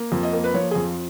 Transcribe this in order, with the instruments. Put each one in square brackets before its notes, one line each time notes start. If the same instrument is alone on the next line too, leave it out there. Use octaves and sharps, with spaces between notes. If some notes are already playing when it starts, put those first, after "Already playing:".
Already playing: [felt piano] A#3
F2
D#5
A#3
B4
F3 C#5
F2 G#4